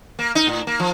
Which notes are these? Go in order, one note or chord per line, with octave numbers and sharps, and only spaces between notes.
A#3
D#4
A2
A#3
F3